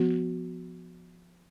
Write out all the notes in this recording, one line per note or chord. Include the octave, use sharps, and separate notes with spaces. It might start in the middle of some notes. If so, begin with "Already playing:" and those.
Already playing: F3 B3 F#4